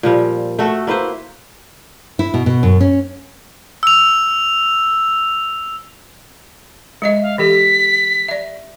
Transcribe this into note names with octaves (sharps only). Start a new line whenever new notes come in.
A#2 F3 G3
A3 F#4 A4
A#3 E4 B4 C5
E4
B2
B2
F#2
C#4
E6 F7
G#3 D#5 E5
F5
E3 G4 A4 B6
D5 E5